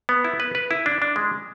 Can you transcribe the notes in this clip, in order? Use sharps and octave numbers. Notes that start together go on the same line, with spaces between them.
B3
E4
B4
B4
E4
D4
D4
G#3